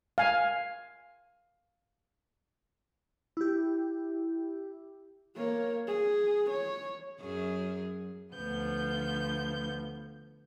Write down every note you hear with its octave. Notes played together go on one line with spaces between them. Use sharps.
F5 G#5
E4 G4
A#3 C#5
G#4
C#5
F#2 F#3 G#4
D2 F3 B3 G6